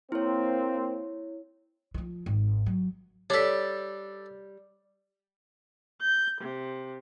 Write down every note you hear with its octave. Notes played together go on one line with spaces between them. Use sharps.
A#3 C4 E4 C#5
E3 F3
G#1
F#3
G3 D4 A4 C#5 B6
G6
C3